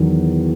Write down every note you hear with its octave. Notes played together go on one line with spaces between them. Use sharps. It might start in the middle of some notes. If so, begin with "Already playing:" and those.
Already playing: E2 D#3 F#3